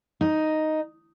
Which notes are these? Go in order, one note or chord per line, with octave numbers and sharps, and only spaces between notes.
D#4